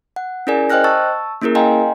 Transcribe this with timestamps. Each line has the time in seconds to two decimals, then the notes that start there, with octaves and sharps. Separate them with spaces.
0.16 F#5
0.47 C#4 E4 G#4 A#4 D5 G#5
0.70 C5 D#5 G5 F6 F#6 A#6
0.84 A5 C#6 E6 A6
1.42 A#3 C#4 E4 G#4 A#4
1.55 D#5 F5 G5 G#5 A#5 C6